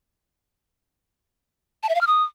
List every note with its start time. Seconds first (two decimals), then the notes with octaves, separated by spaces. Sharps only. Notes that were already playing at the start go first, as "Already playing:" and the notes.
1.83 A5
1.89 E5
1.95 F5
2.01 F6
2.07 D#6